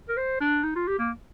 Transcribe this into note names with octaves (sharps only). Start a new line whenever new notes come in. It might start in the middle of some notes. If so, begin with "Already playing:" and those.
A#4
C5
D4
D#4
F4
G4
A#3